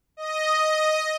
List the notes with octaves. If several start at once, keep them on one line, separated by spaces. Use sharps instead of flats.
D#5